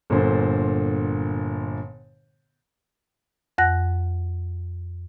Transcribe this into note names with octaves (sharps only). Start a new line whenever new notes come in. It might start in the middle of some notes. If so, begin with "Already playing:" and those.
G1 A#2 D3 C5
F2 F#5 F#6 A#6